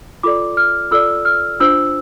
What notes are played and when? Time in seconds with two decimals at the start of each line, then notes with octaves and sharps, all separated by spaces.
0.23 F4 A4 D5 D6
0.57 F6
0.91 F4 A4 D5 E6
1.25 F6
1.60 D4 F4 C5 E6